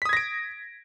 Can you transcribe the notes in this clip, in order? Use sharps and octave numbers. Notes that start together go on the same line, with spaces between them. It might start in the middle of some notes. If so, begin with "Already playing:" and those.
D#6 G#6 A#6 B6 D7